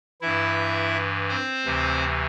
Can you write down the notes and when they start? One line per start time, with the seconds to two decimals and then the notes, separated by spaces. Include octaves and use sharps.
0.21 G2 E3 E4 E5
1.29 C4 C5
1.65 D2 C3 E3